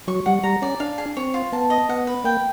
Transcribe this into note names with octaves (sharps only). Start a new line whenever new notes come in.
F#3 C#6
G3 F#5
G3 A#5
C#4 D5
D4 F5
G#4
C4 C#5
F4
B3 A5
D#5
B3 F#5
B4
A#3 G5